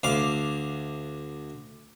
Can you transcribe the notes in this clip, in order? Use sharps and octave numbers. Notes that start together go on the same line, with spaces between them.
D2 F5 D6